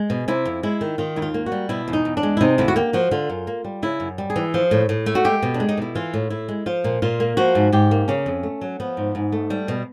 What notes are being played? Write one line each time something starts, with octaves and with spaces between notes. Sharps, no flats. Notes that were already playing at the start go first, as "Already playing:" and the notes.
Already playing: G#3
B2
C3 E4
F2
G#3 E4
D#3
D#3 F4
D#2 E4
F4
A#3
F#4
G3
B2 E4
E2
D#4
E2
D4
G#3
E4
C3 D#4
D2 E4
F#4
A#3 G4
F3 F#4
D3 F4
F#2
A#3
G3
C#3 E4
F#2
G3
G#4
E3
F3
A2
A2
A3
F#4
G#3 G4
B2
D4
G#3
D#4
B2 E4
E3 F4
A2
A2 E4
G#3
F3 F4
A#2
A#2 F4
A#3
F3 F#4
G#2
G#2 G4
A#3
C#3 C#4
F2
A3
F#3
F3 B3
G#2
G#2
A3
G3
B2